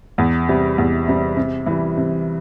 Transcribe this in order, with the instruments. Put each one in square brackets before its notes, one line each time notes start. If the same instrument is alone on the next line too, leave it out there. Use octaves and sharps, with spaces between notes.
[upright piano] E2
C3 G3
E2
C3 G3
C3
E3 G3
C3